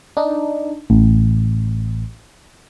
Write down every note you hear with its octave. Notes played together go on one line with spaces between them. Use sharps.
D4 D#4
A1